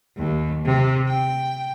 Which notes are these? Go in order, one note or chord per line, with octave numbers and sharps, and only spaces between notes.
D#2
C3
G5